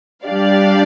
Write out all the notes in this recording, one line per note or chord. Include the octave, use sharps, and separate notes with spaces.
G3 D4 G4 D5 F5